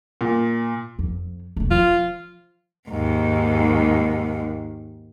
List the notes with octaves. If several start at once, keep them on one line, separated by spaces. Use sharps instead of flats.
A#2
F2
E1 A3
F3 F4
D#2 G#2